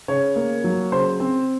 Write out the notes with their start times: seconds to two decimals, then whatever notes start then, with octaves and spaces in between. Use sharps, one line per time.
0.08 C#3 C#5
0.36 A#3
0.64 F#3
0.92 C#3 C5
1.20 C4